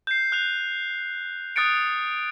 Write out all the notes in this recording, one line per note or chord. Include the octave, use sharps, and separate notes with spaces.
G6 C7
F#6 F7
D#6 F#6 A6 C#7 D7